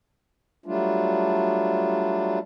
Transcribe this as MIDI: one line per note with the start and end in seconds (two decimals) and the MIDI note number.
0.66 2.39 54
0.66 2.39 55
0.66 2.39 57
0.66 2.39 62
0.66 2.39 65